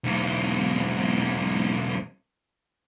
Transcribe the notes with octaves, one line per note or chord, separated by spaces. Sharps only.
B1 E2